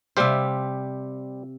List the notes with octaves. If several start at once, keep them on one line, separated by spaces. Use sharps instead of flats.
C3 G3 G4 C5 F5